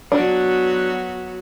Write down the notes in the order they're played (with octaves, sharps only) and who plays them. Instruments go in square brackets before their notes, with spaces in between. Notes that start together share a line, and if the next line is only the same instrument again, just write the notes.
[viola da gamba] F#3 B3 F#4 [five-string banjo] D4